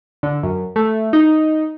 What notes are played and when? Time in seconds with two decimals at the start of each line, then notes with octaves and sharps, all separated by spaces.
0.23 D3
0.43 F#2
0.76 A3
1.13 D#4